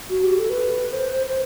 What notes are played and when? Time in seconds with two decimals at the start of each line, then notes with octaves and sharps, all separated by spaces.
0.10 F#4
0.24 G4
0.37 A4
0.50 B4
0.93 C5
1.26 C5